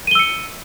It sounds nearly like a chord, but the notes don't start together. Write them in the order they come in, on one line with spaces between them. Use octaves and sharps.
D#7 G7 E6 C#7